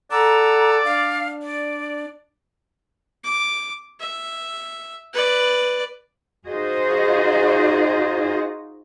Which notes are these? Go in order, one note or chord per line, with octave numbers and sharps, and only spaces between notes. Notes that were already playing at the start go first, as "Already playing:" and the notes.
A4 D5 F#5 A#5 E6
D4 F5
D5
D6
E5
B4 D5
D#4 F4 F#4 G#4 C5 D#5